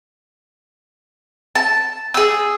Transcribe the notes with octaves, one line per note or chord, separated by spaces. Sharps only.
A5
G#4 E6